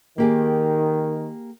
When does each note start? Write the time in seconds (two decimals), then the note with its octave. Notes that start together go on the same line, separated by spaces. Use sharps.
0.18 D#3 A#3 G4 G#4